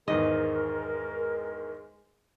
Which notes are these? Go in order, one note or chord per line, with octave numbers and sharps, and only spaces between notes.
E2 G#2 D#3 G#3 A#4 D#5